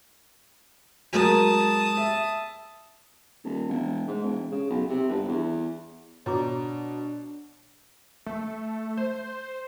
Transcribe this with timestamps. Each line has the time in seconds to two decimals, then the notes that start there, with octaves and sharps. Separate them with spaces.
1.13 F#3 G#3 A#4 A5 D#6
1.97 E5
3.44 D#1
3.69 E1
4.07 G#2
4.23 E1
4.51 C#3
4.70 B1
4.89 C3
5.09 G1
5.28 E2
6.26 B2 D4 C#5 A#5 D6
8.26 A3
8.97 C5